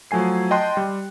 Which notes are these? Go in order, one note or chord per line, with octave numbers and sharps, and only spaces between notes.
F3 F#3 A3 G#5 C7
D#5 G5 A5 C6 F#6
G3